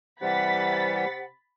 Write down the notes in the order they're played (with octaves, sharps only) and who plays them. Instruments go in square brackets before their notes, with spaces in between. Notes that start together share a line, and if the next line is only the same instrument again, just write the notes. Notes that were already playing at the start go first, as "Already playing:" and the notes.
[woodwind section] C3 F#5 [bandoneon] E3 G3 [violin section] B5 A6 B6